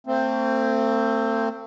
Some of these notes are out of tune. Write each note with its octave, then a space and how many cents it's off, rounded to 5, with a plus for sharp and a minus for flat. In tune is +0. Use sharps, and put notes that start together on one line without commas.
A3 +40 C4 +0